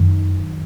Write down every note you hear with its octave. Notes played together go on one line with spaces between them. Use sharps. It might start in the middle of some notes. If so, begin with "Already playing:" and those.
Already playing: F#2 D#3